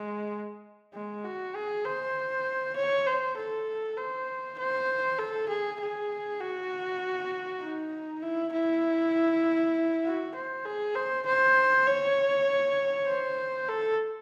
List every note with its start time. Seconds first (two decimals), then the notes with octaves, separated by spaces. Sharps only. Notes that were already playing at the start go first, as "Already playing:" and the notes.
Already playing: G#3
0.94 G#3
1.25 F#4
1.55 G#4
1.85 C5
2.76 C#5
3.06 C5
3.37 A4
3.97 C5
4.58 C5
5.19 A4
5.49 G#4
5.80 G#4
6.41 F#4
7.62 D#4
8.23 E4
8.52 E4
10.05 F#4
10.35 C5
10.65 G#4
10.95 C5
11.26 C5
11.86 C#5
13.08 C5
13.69 A4